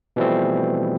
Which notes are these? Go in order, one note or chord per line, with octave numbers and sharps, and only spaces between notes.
B2 E3 F3 G3 A3 C4